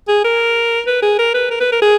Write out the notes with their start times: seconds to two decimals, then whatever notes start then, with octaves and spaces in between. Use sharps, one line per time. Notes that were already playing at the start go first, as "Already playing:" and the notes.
0.08 G#4
0.24 A#4
0.87 B4
1.02 G#4
1.18 A#4
1.34 B4
1.50 A#4
1.60 B4
1.72 A#4
1.82 G#4